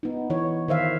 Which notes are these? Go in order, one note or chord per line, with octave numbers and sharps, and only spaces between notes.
B3 D#4
E3 C#5
D#3 C5 E5 F5